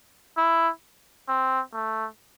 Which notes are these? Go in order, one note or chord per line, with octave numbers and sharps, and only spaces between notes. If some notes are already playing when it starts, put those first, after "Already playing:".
E4
C4
A3